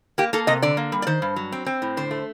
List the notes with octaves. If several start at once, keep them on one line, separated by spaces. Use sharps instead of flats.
A#3 G4
A#3 A4
C3 D#5
D3 D5
A#3
G3
D5
D#3 C5
G2
F#3
C4
C4
A2
D3 C5
A3